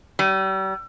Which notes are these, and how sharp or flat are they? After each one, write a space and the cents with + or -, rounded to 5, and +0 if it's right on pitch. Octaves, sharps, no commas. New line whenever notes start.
G3 -40